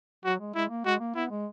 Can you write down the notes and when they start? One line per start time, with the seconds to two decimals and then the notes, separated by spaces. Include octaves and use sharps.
0.25 F#3 F#4
0.40 G#3
0.55 G#3 E4
0.70 A#3
0.85 G#3 F#4
1.00 A#3
1.15 B3 E4
1.31 G#3